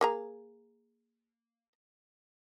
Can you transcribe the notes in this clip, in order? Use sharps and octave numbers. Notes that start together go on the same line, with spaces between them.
A#3 G#4 A#5